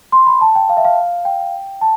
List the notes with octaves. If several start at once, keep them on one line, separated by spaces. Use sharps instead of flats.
C6
B5
A5
G5
F5
E5
F5
G5
A5